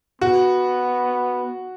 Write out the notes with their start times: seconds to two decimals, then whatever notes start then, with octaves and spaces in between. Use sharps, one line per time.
0.21 B3 F#4